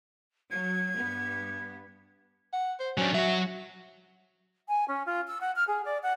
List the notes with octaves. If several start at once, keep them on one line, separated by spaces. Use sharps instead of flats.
F#3 G#6
G2 B3
F#5
C5
F#3 C#4 D4
F#3 F#4 E5
G#5
C#4
F4
E6
F#5
F6
G#4
D5
F#5